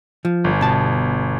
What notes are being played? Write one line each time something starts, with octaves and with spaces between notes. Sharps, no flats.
F3
G1
B2 A5